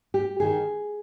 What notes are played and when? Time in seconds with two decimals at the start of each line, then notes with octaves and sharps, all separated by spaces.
0.14 G4
0.40 D#3 G#4